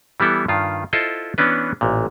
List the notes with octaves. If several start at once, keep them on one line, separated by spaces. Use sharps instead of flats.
E3 G3 B3 E4 A4
G2 D#3 F4
E4 F4 A4 C5 D#5
E3 B3 C#4 D4 B4
A1 A#2